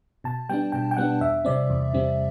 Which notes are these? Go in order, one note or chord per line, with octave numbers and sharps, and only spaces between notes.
B2 A5
G3 B3 D4 G5
B2 G5
G5
G3 B3 D4 F#5
E2 E5
C3 G3 C4 D5
E2
C3 G3 C4